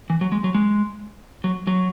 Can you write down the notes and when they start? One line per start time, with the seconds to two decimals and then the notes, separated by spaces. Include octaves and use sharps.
0.10 E3
0.21 F#3
0.32 G#3
0.44 F#3
0.54 G#3
1.44 F#3
1.67 F#3